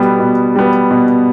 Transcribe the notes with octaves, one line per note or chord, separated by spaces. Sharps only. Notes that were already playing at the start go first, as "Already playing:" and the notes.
Already playing: B2 G3 B3
B2
G3 B3
B2